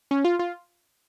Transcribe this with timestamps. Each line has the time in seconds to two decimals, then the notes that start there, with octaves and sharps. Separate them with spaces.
0.11 C#4
0.25 F4
0.39 F4